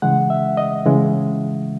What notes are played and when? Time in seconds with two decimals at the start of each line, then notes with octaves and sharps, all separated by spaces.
0.02 C#3 E3 G#3 F#5
0.30 E5
0.57 D#5
0.86 C#3 E3 G#3